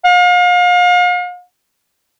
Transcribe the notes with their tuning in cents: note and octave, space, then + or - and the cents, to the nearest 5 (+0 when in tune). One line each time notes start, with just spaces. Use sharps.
F5 +40